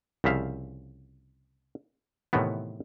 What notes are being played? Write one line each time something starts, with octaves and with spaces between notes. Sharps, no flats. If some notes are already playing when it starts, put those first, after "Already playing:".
C2 C#3 F3 E5 F5
A2 C3 D#3 E3 B3